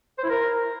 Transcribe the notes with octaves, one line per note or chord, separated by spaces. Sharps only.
C5
E4
A#4